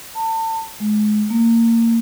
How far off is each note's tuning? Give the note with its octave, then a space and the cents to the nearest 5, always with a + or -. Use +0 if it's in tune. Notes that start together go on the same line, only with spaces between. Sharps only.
A5 +35
G#3 +30
A#3 -25